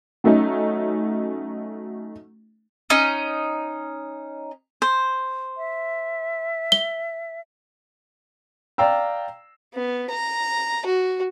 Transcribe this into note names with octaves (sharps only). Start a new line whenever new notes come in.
F#3 A3 C#4 D#4
C#4 D#4
C5
E5
G7
D5 F5 G5 A#5 E6
B3
A#5
F#4